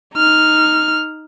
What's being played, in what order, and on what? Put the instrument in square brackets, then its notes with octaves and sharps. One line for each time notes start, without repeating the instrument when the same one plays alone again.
[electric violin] D#4 F6